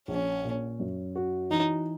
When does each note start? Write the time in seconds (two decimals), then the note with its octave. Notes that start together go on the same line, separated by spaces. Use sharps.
0.08 A#1 C#4
0.44 A#2
0.80 F#2
1.15 F#4
1.50 E3 D#4